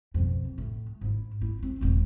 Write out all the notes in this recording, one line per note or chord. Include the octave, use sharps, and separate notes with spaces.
F2 B2
A2
G#2 E4
E4
C4
E1 A#1